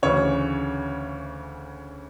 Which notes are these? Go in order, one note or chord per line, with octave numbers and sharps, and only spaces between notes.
D2 C#3 E3 C#5